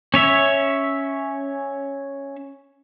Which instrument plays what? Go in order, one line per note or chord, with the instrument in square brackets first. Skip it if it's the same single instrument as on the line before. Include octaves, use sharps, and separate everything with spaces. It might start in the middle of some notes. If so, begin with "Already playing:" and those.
[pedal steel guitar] C#4 C#5 E5